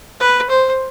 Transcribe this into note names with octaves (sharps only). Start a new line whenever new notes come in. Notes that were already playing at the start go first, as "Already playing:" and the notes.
B4
C5